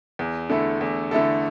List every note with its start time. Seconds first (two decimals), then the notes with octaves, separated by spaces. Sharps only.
0.19 E2
0.50 D3 A3 E4 A4
0.81 E2
1.11 D3 A3 E4 A4